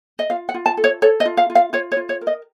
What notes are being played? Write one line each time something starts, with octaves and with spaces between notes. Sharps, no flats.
D#5
F4 F5
F#5
F4
A5
A4
C#5
A4 C#5
D#5
F4
F5
F4
F5
F4 C#5
C#5
F4
C#5
A#4
D#5